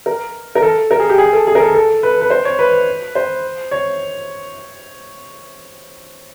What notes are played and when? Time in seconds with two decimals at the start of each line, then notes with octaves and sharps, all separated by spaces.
0.06 A#4
0.55 A#4
0.62 A4
0.91 A#4
1.00 G#4
1.10 G4
1.18 G#4
1.33 A4
1.47 G#4
1.55 A#4
1.60 A4
1.75 A4
2.03 B4
2.21 B4
2.30 C5
2.45 C#5
2.59 B4
3.15 C5
3.71 C#5